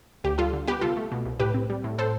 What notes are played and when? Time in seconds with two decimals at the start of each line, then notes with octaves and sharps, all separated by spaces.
0.24 D2 G4
0.38 G3 F4 A4
0.53 D3
0.67 B3 G4 B4
0.81 C2 F4 A4
0.97 A3
1.12 B2
1.25 C2
1.40 A2 G4 B4
1.54 C4
1.70 G3
1.84 A2
1.98 A2 A4 C5